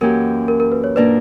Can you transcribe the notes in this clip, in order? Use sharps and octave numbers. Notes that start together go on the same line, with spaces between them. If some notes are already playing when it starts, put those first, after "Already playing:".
F#2 E3 A#3 C#4 G4 A#4
A#4
A#4
B4
C#5
A#2 A#3 D4 A#4 B4 D5